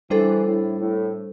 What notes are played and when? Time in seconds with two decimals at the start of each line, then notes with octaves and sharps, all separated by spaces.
0.10 E3 G3 D4 A4 C5
0.46 A2
0.80 A2